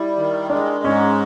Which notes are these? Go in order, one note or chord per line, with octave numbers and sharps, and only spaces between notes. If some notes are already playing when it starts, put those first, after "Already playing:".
Already playing: G3 E4
D#3
G#3 D4
G#2 C#4